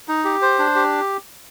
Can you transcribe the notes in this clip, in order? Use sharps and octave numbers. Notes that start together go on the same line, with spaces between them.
D#4
G4
C5
D4
G4